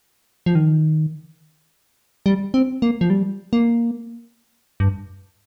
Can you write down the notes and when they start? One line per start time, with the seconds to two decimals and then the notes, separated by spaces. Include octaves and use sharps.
0.46 F3
0.55 D#3
2.26 G3
2.54 C4
2.82 A#3
3.01 F3
3.10 G3
3.53 A#3
4.80 G2